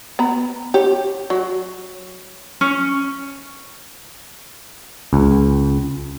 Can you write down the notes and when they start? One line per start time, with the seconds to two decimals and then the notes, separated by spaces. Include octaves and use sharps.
0.19 B3 A#5 B5
0.74 G4 C#5
1.30 F#3
2.61 C#4
5.13 C#2